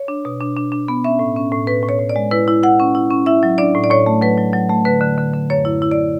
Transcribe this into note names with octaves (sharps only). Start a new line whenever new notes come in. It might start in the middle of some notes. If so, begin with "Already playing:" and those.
Already playing: C#5
D4
B2
D4
D4
D4
B3
C#4 E5
A2
C#4
A2
A2 B4
A2
C#5
A2
D5
G#3
E4 B4
E4
E4 F#5
C#4
E4
C#4
E4 E5
F#3
D4 D5
A2
D5
A2 C#5
A3
F#3 B4
F#3
F#3
A3
D3 B4
D3
D3
D3
F#2 C#5
E4
E4
D5